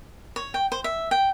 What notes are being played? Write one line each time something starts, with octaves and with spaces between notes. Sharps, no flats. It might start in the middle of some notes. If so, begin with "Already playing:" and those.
C#5
G5
C5
E5
G5